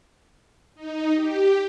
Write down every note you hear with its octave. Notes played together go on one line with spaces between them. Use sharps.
D#4
G4